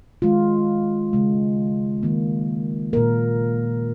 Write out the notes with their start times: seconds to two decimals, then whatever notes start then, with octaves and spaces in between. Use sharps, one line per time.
0.22 D#3 G#3 F4
1.13 C#3 G#3
2.03 D#3 A#3
2.93 A#2 A#3 A#4